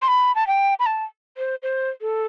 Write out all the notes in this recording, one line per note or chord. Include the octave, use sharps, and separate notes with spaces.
C6
B5
A5
G5
B5
A5
C5
C5
A4